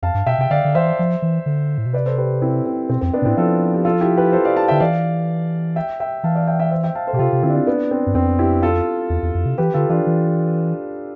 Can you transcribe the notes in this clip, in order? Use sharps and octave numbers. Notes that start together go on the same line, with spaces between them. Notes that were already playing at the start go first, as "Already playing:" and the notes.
F2 F5 A5
G2
B2 E5 G5
C3 G5
D3 D5 F5
D3
E3 C5 E5
F3
E3
D3
A2
B2
C3 B4 D5
A4 C5
G4 B4
C4 E4
C4
B2 C4
F2 C4
B3 D4
B2
A2 C4 E4
F3 F4 A4
G4
F4 A4
E4 G4
G4 B4
A4 C5
D5 F5
F5 A5
D3 E5 G5
E3 D5 F5
E5 G5
E5 G5
E3 F5 A5
D5 F5
E5 G5
E5 G5
C5 E5
E5 G5
F5 A5
A4 C5
B2 G4
C3 F4 A4
C3
D3 C4 E4
D4
C4
B3 D4
C4
G2
F2 C4
E4 G4
F4 A4
E2
E2
F2
C3
E3 G4 B4
D3 F4 A4
E3 D4 F4
E3